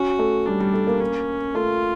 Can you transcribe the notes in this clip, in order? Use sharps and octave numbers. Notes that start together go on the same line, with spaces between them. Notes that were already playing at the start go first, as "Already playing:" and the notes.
Already playing: C#4 F#4
A3
G3 D4
G3
A3
A#3
C#4
A3 F4